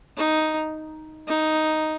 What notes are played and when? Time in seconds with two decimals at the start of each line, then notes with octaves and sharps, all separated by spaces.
0.17 D#4
1.28 D#4